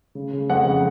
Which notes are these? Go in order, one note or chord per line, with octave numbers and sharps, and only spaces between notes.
C#3
C#3
F2 F#5
C#3